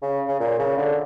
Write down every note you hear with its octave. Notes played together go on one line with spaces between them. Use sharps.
C#3
C#3
A#2
C#3
D3